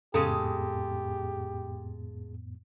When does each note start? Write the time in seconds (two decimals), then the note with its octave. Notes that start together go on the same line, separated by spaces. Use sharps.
0.14 F2 A2 C#3 G#3 B3 G4 A4